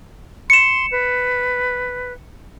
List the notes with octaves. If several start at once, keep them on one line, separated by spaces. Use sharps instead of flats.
C6 C#7 E7
B4